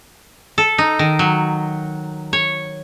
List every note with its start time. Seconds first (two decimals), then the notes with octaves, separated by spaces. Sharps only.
0.58 A4
0.78 D#4
0.99 D#3
1.19 F#3
2.33 C#5